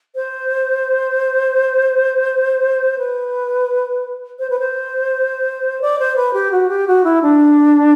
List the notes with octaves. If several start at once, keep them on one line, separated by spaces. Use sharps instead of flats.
C5
B4
C5
B4
C5
D5
C5
B4
G4
F#4
G4
F#4
E4
D4